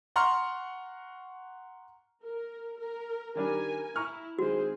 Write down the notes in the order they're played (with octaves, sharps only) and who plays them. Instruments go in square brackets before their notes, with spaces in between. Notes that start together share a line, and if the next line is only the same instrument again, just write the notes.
[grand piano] F#5 A#5 C6 C#6 F6
[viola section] A#4
A#4
[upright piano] D#3 G3 D4 [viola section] A#4 G#5
[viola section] E4 [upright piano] A#5 C#6 F6
[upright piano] D#3 G#3 [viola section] C4 G#4 C5 [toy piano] F#4